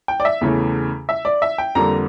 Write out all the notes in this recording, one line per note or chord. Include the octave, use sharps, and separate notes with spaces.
G5
D5
E5
E2 C#3 E3 A3
E5
D5
E5
G5
F2 D3 G3 A#3 A#5